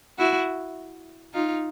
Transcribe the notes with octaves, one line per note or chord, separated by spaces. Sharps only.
E4 F#4
D#4 F4